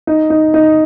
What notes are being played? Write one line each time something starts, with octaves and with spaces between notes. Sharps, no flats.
D#4
D#4
D#4